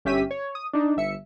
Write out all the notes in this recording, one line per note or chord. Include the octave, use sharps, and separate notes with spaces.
G1 C#4 G4 E5 B6 D#7
C#5
D#6
D4 D#4
G1 E5 C#7